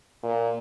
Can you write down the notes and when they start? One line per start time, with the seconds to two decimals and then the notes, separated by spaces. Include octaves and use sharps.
0.23 A#2